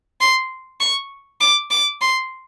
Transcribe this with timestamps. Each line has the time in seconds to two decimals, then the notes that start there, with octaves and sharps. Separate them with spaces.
0.21 C6
0.80 C#6
1.41 D6
1.71 D6
2.01 C6